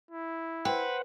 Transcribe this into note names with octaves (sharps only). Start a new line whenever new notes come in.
E4
B4 C5 F#5 G5